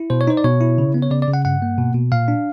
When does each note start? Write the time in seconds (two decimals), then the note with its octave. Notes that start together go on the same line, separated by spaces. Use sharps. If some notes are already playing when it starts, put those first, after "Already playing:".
Already playing: E4
0.10 B2 C5
0.21 C#5
0.27 D#4 C5
0.37 D5
0.44 B2 C#5
0.61 E4
0.78 C#3
0.94 B3
1.02 C#5
1.11 C#3 D5
1.22 D5
1.28 C#3
1.33 F#5
1.45 G2 F#5
1.62 A#3
1.78 B2
1.95 B2
2.12 A#2 F5
2.28 D4